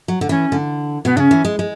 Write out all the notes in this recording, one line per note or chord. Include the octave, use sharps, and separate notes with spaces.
F#3
D3
E3 C#4
D3
B2 B3
C#3 C#4 D4
E3
G#3
G#3